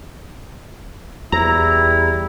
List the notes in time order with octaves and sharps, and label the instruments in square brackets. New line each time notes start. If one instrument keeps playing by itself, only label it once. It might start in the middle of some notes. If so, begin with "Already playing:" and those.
[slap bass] E2 [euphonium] G3 [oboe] E4 [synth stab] A#5